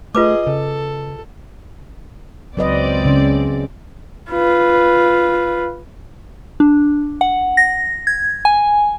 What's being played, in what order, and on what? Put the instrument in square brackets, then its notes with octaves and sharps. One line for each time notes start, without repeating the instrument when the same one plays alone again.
[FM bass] A3 [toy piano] F4 B4 D6 [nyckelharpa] G#4 D#5
[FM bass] C#3 [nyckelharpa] A4
[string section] C#2 C4 D5 [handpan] F#3 B4 D#5
[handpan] C#3 C#4
[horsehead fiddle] F4 B4
[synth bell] D4
F#5
A#6
G#6
G#5